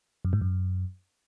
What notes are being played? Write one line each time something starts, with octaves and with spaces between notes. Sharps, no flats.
F#2
G#2
F#2